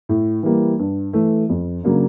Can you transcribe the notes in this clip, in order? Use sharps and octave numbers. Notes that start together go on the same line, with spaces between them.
A2
E3 G3 A#3
G2
E3 A3
F2
C#3 F#3 A#3 D4